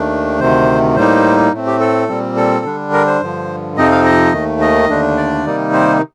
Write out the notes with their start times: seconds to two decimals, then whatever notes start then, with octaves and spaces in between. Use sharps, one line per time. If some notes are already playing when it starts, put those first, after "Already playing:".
Already playing: D#2 D#3 A3 D4
0.40 D2 C3 D#3 C5
0.96 A2 G3 A#3 D#4 C5
1.52 A2 A3 C4
1.67 G4
1.80 A4
2.09 A#2 G3 C4
2.37 A4
2.65 D3 G3 D4
2.93 A#4
3.07 C5
3.21 G2 D3 F3
3.77 F2 C3 F3 C4 D#4 D#5
3.91 F5
4.05 D#5
4.33 D#2 D#3 A3
4.61 D#5
4.89 D#2 D3 A3 D4
5.17 D5
5.45 C3 D#3 G3 A#3 D#4
5.73 C5